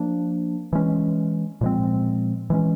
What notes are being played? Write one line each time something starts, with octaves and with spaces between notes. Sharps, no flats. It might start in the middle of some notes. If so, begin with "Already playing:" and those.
Already playing: F3 A#3 D4
E3 G#3 C#4
A#2 F3 G#3 C4
E3 G#3 C#4